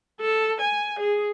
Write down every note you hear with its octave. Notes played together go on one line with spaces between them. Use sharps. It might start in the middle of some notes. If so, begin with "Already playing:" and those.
A4
G#5
G#4